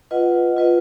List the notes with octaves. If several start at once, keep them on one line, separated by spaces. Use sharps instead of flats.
F4 B4 D#5 F#5
F4 B4 D#5 F#5